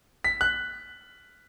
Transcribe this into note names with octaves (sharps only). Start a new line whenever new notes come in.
B6
F#6